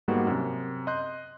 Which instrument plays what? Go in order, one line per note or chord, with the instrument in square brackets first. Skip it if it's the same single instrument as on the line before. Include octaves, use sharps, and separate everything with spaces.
[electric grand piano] G#2 G3 A#3 B3 F#4
F#2 C3
D#5 C6 F#6 G6